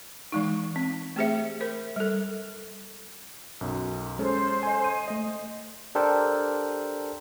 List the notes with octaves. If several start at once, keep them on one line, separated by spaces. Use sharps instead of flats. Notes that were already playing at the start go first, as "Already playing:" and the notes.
E3 G#3 D#4
C4
A3 C4 G4 G#4 C5 E5
A#4 C5 B5
G3 A4
B1 F#2
G#3 C#4 A4 C5
D#5 G#5
D#7
A3 D#5
D4 G4 A4 A#4 C5